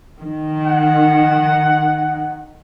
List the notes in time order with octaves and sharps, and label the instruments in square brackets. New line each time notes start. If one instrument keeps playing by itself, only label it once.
[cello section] D#3
[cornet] F#5